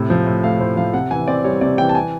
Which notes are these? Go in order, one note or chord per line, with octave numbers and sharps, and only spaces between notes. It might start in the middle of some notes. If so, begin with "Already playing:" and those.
Already playing: A2 C3
F3
A2
A3 F5
A2 C5
F3 F5
C3 F#5
E3 G#5
C4 D5
G3 C#5
C3 D5
E3 G5
A5
G#5